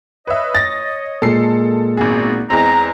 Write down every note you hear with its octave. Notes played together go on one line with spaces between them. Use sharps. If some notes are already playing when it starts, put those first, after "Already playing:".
B4 C#5 D#5 E5
A6 A#6
A#2 G#3 A4 C7
G#1 B3 C4 F#4 G#4
E2 G#3 C4 A#5